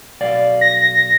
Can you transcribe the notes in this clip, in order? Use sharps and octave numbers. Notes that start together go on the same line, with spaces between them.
B1 D5 F5
A#6